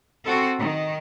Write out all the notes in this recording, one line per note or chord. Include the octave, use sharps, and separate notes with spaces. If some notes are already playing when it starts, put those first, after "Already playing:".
C4 F#4 A4
D#3